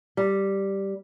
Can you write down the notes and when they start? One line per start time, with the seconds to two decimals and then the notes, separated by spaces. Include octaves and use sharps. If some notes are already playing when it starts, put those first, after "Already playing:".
0.17 G3